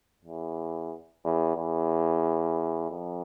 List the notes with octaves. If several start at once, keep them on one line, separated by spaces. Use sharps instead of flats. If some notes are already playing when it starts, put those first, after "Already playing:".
E2
E2
E2
F2